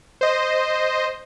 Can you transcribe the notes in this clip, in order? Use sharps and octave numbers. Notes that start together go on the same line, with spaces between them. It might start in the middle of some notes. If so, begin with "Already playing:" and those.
C5 D#5